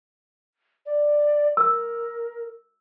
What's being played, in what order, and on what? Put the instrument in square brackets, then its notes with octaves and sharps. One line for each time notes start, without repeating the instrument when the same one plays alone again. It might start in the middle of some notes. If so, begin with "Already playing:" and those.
[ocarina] D5
[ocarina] A#4 [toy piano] E6